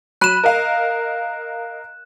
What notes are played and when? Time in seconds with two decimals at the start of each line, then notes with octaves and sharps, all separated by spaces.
0.21 F#3 B5 F#6 D#7 E7
0.44 A#4 D#5 F5